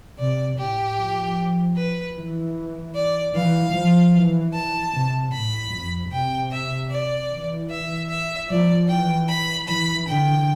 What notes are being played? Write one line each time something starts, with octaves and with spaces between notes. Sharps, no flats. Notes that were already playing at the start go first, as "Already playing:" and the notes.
C3 D5
A2 G4
F3
B4
E3
D5
E3 F5
F3
E3
A5
C3
A2 B5
F2
C3 G5
E5
D5
E3
E5
E5
F3 D5
E3 G5
B5
E3 B5
D3 G5